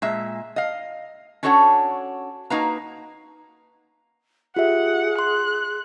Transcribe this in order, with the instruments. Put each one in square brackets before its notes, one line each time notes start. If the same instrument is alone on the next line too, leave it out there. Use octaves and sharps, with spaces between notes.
[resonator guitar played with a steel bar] A#2 G#3 E5
D#5 F5
C#4 D4 F#4 A4 C#5 F#5
A#3 D#4 F#4 B4 F5 A#5
[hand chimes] F4 G4 E5 [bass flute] G#4 [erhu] F#5
[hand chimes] C6 [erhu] F#6